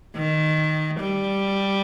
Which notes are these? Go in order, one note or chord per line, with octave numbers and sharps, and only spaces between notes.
D#3
G3